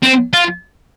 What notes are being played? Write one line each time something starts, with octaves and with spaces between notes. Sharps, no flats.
C4
F4